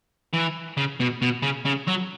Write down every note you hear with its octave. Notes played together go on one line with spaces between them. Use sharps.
E3
C#3
B2
B2
C#3
C#3
F#3